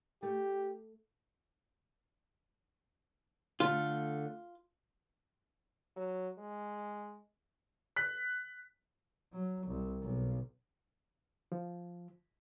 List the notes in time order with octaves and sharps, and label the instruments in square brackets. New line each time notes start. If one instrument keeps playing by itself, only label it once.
[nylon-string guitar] A3 [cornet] G4
[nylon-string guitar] D3 A3 [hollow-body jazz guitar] F4
[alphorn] F#3
G#3
[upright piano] F#6 B6
[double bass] F#3
C2
B1
[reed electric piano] F3